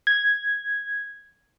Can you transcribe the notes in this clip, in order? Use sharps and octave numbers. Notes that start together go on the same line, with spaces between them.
G#6